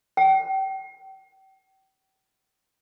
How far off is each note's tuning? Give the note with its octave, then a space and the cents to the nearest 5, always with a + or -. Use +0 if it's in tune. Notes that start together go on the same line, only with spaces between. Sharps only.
G5 -35